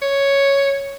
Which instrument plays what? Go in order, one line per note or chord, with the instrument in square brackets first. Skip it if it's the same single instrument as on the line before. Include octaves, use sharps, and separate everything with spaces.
[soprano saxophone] C#5